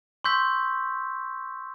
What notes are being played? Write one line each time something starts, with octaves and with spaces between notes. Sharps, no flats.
C6 C#6 E6 G6 B6